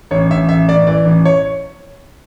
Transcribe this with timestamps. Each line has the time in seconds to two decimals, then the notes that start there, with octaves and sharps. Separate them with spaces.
0.11 A1 C#5
0.30 A1 E5
0.49 A1 E5
0.68 A1 D5
0.87 E3 D5
1.06 A1
1.25 C#5